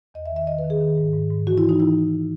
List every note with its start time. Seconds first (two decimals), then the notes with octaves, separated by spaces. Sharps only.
0.14 E2 D#5
0.26 E5
0.31 D#3
0.36 E5
0.47 D#3 D#5
0.59 B4
0.64 D#3
0.70 G#4
0.81 D#3
0.98 G#2
1.13 G#2
1.30 G#2
1.47 E3 F#4
1.58 E4
1.63 E3
1.69 D#4
1.79 E3 E4